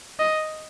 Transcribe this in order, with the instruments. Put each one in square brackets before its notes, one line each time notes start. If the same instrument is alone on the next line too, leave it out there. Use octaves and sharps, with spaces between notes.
[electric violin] D#5